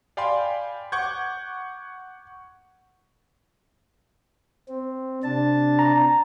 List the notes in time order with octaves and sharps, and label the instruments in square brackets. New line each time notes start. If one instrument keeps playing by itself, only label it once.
[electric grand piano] D5 F5 G5 G#5 B5 C6
F#5 C#6 D6 G6 G#6
[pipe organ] C4
C3 D4 A5
[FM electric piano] A#5